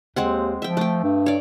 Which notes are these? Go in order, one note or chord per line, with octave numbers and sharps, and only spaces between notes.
D#2 G#3 C4 F#5
F3 E5 G5
A3 G5
G2
C#5 D5